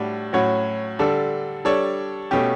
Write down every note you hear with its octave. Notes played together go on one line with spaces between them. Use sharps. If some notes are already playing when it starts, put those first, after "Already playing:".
Already playing: A2 G3 D4 F#4
A2 F#3 C#4 F#4 C#5
D3 G3 D4 A4
G3 D4 A4 C#5
B2 A3 C#4 G4